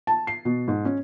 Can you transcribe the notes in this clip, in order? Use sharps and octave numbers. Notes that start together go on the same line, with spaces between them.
A5
C7
B2
G#2
C#4